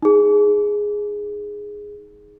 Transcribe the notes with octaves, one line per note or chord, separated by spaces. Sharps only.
D#4 G#4